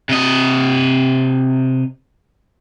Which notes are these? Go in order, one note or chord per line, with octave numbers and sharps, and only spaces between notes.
C3 D#5